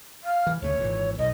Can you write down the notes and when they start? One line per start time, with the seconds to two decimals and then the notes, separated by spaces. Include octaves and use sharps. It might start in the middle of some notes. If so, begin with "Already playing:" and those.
0.24 F5
0.47 E3
0.62 D2 C#3 A3 C#5
0.79 G#1 A#2 E3
1.18 B1 D#5